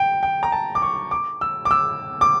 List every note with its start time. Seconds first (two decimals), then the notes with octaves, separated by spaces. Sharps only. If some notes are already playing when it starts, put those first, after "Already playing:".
Already playing: G5
0.23 G5
0.43 A#5
0.52 A5
0.75 D6
0.82 C#6
1.11 D6
1.41 E6
1.65 D6
1.71 E6
2.21 D6